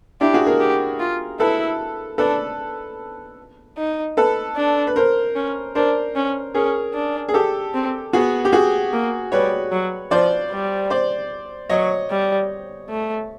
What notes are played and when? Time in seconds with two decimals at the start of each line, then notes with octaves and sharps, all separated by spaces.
0.21 D4 E4 G4
0.33 F#4 G#4
0.46 G#4 A#4
0.60 G4
0.99 F4
1.40 E4 A4 B4
2.18 D4 A4 B4
3.78 D#4
4.17 A4 B4
4.56 D4
4.87 B4
4.96 A#4 C5
5.36 C#4
5.75 D4 A#4 C5
6.15 C#4
6.54 C#4 G#4 A#4
6.94 D4
7.29 G#4
7.34 G4 A4
7.74 C4
8.13 B3 F#4 G#4
8.45 G4
8.52 F#4 G#4
8.93 A#3
9.32 G3 B4 C#5
9.72 F#3
10.11 F3 C5 D5
10.51 G3
10.90 C5 D5
11.70 F#3 C#5 D#5
12.10 G3
12.89 A3